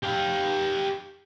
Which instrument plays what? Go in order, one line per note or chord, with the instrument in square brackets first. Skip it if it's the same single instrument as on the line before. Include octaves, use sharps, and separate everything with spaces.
[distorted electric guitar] G4 F5